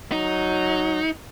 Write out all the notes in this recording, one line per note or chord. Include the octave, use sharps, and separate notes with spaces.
F#3 D#4